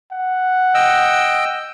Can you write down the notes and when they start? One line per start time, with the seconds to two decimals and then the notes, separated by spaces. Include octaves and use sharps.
0.12 F#5
0.74 D#5 G5 E6